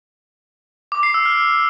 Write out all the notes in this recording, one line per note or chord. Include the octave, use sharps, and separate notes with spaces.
D6
C7
E6
F6